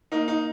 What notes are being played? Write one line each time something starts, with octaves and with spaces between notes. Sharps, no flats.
A#3 D#4
D#4